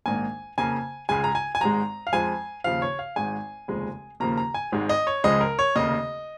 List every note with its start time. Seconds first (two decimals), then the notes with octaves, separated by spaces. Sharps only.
0.06 A#1 G#2 D#3 A#3 G#5
0.58 F2 C#3 A#3 G#5
1.09 C#2 C#3 G#3 G#5
1.24 A#5
1.35 G#5
1.55 G#5
1.61 G#1 G#2 G#3 A#5
2.07 F5
2.12 F2 F3 G#3 G#5
2.64 D#2 C#3 F3 F5
2.82 C#5
2.99 F5
3.16 G#1 G#2 G#3 G#5
3.68 F1 D#2 C#3 F3 G#3
4.20 D#2 C#3 F3 A#3 A#5
4.38 A#5
4.54 G#5
4.72 G#1 G#2 D#3 G#3
4.89 D#5
5.07 C#5
5.24 C#2 C#3 F3 G#3 D#5
5.41 A#4
5.59 C#5
5.75 F1 D#2 C#3 A#3 D#5